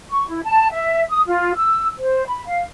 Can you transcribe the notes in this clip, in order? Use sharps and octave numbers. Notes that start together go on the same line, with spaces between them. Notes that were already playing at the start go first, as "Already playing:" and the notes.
C#6
E4
A5
E5
D#6
F4
E6
C5
B5
F5